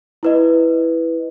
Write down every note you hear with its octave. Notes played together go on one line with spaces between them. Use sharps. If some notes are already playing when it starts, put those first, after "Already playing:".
E4 B4 D#5